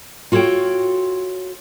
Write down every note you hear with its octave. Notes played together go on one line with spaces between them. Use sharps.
F4 F#4 A4 C#5 G5